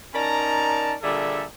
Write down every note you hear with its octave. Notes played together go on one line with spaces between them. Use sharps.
C#4 D#4 A#4 D5 A5 A#5
A#2 D3 G3 G#4 A4 E5